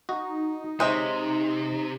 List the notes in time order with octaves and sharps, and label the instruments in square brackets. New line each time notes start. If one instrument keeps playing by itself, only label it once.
[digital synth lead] D#4 [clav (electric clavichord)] F#4
[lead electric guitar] C3 [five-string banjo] G#3 C#5 E5 [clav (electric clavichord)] C5 D#5 G5